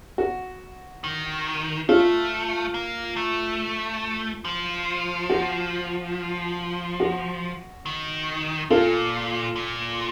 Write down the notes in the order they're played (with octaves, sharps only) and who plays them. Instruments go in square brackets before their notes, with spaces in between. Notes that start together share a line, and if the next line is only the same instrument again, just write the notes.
[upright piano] F#4
[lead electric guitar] D#3
[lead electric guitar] A3 [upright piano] F4
[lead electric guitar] A#3
A3
F3
[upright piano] F#4
F#4
[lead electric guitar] D#3
[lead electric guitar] A#2 [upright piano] F4 A4
[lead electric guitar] A#2